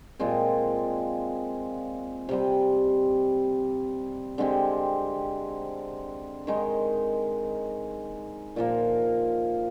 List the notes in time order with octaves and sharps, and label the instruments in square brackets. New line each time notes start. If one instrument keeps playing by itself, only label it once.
[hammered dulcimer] A#2 G#3 C4
C3 G3 C4
D3 G#3 C4 G4
D#3 G#3 D#4
A#2 F3 A#3